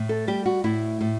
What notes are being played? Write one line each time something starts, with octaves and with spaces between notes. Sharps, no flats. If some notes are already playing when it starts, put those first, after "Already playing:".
Already playing: A2
A4
G3 G4
F#4
A2 E4
A2